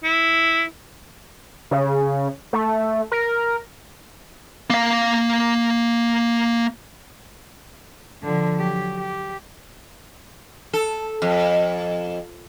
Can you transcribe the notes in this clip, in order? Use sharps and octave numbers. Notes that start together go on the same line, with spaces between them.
E4
C#3
A3
A#4
A#3 F5
D3 F3
F#3 G4
G4
A4
F2